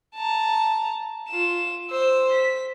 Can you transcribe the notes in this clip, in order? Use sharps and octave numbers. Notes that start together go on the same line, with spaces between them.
A5 A#5
F4 E7
C5 E6
B6